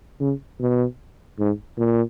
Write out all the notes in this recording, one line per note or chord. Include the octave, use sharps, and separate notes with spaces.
C#3
B2
G#2
A#2